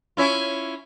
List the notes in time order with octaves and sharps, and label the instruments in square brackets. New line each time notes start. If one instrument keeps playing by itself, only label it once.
[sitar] C#4 E4 F4